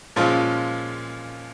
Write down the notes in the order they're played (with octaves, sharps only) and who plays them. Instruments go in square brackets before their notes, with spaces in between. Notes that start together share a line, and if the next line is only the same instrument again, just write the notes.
[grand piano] A#2 F3 G#3 C#4 F4